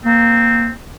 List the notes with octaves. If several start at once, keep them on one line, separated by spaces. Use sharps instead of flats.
A#3 C4